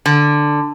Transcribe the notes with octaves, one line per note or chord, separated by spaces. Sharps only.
D3